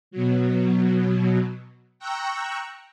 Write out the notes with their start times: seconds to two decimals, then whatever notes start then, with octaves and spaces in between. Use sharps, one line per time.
0.11 B2 F#3
1.99 G5 A#5 C#6 E6 F#6